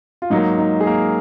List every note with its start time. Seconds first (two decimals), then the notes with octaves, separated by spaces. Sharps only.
0.22 F4
0.30 G#2 F#3 A#3 D#4
0.59 D#4
0.80 G#4
0.87 A#3 A#4